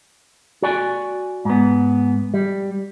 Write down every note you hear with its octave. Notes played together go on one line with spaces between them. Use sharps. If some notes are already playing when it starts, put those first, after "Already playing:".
F#4 D5 G#5
G#2 B3
G3